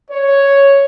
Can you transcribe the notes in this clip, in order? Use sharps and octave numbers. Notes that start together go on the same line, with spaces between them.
C#5